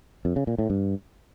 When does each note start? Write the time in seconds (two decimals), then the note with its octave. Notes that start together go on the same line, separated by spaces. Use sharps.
0.25 F2
0.36 C#3
0.47 A#2
0.58 A2
0.70 G2